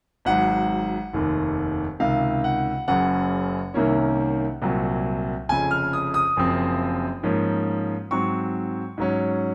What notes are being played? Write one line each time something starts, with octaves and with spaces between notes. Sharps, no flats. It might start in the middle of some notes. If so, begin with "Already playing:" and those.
G#1 G#2 F#3 F#5
F1 D#2 D#3
C#2 C3 D#3 F5
F#5
F#1 F#2 C#3 F#3 F#5
C2 C3 D#3 A#3 C#4
C2 A#2 F#3 C4
F1 F2 C#3 G#5
F6
D#6
D#6
F#1 F#2 F3 C4
G#2 F3 A#3 C#4
G#2 F#3 C4 C#6
G#2 F#3 C#4